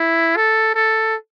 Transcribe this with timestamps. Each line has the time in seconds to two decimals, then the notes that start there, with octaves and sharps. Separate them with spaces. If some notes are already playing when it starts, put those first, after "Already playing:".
Already playing: E4
0.37 A4
0.75 A4